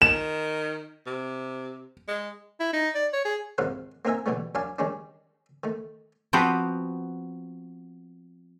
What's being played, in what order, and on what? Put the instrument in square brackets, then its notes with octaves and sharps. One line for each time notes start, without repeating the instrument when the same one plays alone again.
[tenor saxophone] D#3 [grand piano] E7
[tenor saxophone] C3
G#3
[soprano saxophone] E4
D#4
D5
C#5
G#4
[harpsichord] C#2 G#2 C3 D#3 F5 F#5
A#3 C4 D#4 A#4 E5 G#5
B2 D3 E3 G3 A3
F#2 D4 F5 G#5 A5
D#3 G3 G#3 C#4 D4
D#3 A3
[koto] F3 B3 C4 F#4 G4 B4